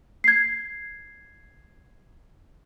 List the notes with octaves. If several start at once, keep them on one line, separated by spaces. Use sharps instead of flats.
G#6 C7